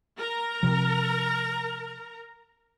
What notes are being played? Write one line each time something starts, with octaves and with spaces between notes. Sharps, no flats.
A#4 A#5
C3 F3